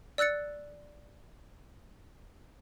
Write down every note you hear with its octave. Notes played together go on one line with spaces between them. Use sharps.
D5 E6 F#6 A6 C#7